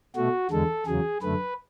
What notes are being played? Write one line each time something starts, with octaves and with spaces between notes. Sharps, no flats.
B2 A3 F#4
E2 D3 G#3 A4
E2 C#3 F#3 G#4
F#2 D3 A3 B4